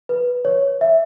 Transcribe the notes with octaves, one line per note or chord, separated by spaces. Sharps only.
B4
C#5
E5